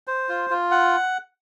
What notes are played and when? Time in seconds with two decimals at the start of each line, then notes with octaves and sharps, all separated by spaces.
0.07 C5
0.29 F4
0.50 F4
0.71 F#5